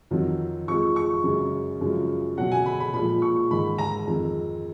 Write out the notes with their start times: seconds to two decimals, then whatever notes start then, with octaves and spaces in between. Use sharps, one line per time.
0.11 F2 D#3 F#3
0.68 F2 F3 G#3 C#6
0.96 C#6
1.24 F#2 C#3 G#3
1.81 F#2 C#3 F3 G#3
2.37 B2 F#3 F#5
2.51 G#5
2.66 B5
2.80 B5
2.94 A#2 F3 G#3 B5
3.22 C#6
3.51 G#2 D#3 G#3 B5
3.78 A#5
4.07 F2 D#3 G#3